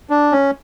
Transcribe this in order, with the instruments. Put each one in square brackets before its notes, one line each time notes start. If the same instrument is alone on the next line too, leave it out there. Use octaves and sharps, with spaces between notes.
[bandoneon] D4
C#4